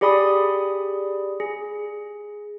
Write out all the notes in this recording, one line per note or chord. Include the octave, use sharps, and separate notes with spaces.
G4 G#4 D5 B5 D#6
G#4